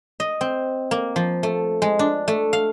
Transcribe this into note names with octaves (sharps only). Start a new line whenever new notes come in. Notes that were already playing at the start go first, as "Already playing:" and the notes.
D#5
C4
A#3
F3
A3
G#3
D4
A3
F5